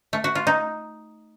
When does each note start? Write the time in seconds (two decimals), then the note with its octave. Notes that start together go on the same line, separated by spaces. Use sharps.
0.13 A3
0.24 F#4
0.35 F4
0.47 D#4